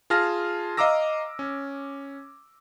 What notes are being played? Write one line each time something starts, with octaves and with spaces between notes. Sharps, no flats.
F4 G#4 A5 F6 A#6
D#5 F5 A#5 D6 E6 A#6
C#4